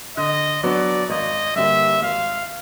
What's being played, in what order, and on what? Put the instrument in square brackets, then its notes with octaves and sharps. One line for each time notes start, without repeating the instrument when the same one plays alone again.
[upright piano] D3 [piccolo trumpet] D#5
[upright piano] F#3 B3 D4 F#4 [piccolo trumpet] D5
[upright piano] G#1 [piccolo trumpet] D#5
[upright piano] G2 D3 G3 A#3 [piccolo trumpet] E5
[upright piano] G#1 [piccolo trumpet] F5